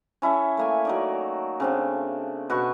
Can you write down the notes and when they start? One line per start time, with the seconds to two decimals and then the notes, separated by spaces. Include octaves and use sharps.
0.22 C#4 E4 A4 E5
0.57 A3 A#3 G#5
0.85 F#3 D#4 D5
1.60 C#3 C4 D4
2.50 B2 F#4 B4 C#6